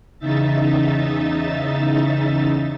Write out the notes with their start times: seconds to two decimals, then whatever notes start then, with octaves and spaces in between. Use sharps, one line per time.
0.19 E2 C#3 D#4 E5 A6